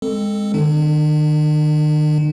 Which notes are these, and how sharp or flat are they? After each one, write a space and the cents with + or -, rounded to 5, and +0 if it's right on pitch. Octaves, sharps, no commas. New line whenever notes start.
G#3 -15 C4 +0 A4 +10
D#3 -35 D4 +40